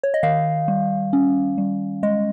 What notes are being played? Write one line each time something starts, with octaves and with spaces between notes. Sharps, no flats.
C#5
D#5
D#3 F5
G3
C#4
G3
G#3 D#5